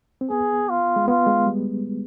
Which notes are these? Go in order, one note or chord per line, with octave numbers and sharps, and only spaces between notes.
C4
B3 G#4
F4
G#3
B3 F4
G#3
G3